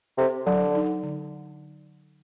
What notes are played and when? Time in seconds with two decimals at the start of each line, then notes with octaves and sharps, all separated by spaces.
0.18 C3 A4
0.46 D3 F#3
0.75 D#4
1.03 D3